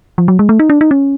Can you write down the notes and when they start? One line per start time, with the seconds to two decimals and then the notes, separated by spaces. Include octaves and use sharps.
0.18 F3
0.28 F#3
0.39 G#3
0.49 A3
0.59 D#4
0.70 D4
0.81 D#4
0.91 C#4